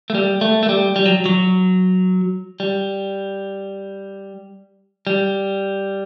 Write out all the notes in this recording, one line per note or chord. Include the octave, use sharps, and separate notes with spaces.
A3
G3
A3
A3
G3
G3
F#3
F#3
G3
G3